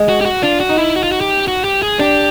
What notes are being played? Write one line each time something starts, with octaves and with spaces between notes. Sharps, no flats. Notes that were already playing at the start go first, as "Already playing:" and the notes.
Already playing: G#3
F#4
G4
F#4
D4 F4
F#4
D#4
E4
F#4
F4
F#4
G4
F#4
G4
G#4
D4 G4